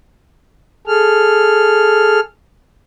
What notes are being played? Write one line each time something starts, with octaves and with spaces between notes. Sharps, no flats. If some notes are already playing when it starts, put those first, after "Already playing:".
G#4 A4 F6